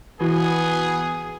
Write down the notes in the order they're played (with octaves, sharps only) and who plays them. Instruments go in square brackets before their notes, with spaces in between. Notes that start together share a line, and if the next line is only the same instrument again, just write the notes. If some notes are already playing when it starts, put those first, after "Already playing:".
[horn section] B2 B3 [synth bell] E3 E4 F#4 [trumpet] G#4